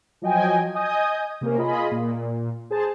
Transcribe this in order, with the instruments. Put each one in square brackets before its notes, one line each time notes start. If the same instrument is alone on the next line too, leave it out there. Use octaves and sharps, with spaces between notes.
[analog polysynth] F3 F#3 D#5 G5 G#5
D#5 G#5 D#6 G6
C3 A#3 C#4 A#4
F4 G#4 D#5 B5
A#2
G#4 C5 A5